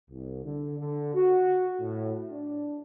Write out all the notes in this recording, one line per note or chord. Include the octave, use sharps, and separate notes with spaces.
C2
D3
D3
F#4
A2
D4